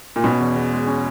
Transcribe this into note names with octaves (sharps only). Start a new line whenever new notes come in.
A#2
B2 C#4
E2
E2
G#3
C#4